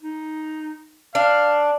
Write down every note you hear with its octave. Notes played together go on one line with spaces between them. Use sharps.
D#4
D4 F5